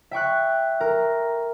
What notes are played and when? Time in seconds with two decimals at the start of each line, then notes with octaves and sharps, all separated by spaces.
0.11 E5 G5 C#6 F#6
0.81 A#4